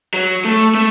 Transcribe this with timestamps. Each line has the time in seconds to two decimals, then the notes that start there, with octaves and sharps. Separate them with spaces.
0.14 F#3
0.45 A3
0.75 A3